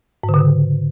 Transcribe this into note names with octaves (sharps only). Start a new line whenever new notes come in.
G#2
D3
C#3
D3